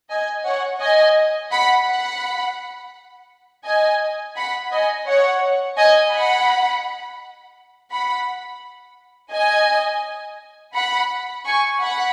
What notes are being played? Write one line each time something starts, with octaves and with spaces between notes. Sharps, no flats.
D#5 G#5
C#5 F#5
D#5 G#5
F#5 B5
F#5 B5
D#5 G#5
F#5 B5
D#5 G#5
C#5 F#5
D#5 G#5
F#5 B5
F#5 B5
D#5 G#5
F#5 B5
G#5 C#6
F#5 B5